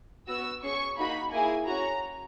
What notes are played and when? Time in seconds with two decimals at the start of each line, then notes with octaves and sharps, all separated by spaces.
0.28 B3 F#4 E6
0.63 C#4 G#4 C#6
0.97 A#3 D#4 F#4 B5
1.32 A#3 E4 G#4 G#5
1.67 C#4 F#4 A#5